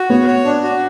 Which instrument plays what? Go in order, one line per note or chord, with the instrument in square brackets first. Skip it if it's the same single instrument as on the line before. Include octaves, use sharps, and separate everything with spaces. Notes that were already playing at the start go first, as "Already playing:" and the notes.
Already playing: [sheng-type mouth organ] F#4
[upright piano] B3 [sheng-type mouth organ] C#5
[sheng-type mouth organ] C#5
D4
F#4